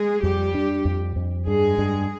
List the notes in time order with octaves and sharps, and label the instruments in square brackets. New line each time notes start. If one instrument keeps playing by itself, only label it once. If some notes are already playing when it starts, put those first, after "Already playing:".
Already playing: [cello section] G#3 G#4
[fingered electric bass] F2 [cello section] G3 G4
[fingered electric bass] D4
F2
F2
[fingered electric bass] G2 [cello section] G#3 G#4
[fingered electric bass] G2